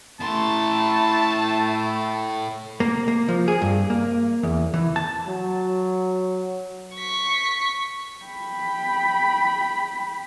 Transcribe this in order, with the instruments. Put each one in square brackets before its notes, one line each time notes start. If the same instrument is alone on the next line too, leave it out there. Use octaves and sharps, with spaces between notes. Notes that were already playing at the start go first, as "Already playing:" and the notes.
[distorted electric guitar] A2 C6 [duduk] A3 [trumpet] A5
[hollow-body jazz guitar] A#3
A#3
F3
G#4
G2
A#3
E2
E3
A5
[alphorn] F#3
[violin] C#6 B6
[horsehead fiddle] G5 B5